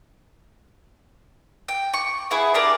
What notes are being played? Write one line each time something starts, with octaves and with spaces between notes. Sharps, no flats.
G5
C#6
B3 E4 G#4
D4 G4 A#4 D5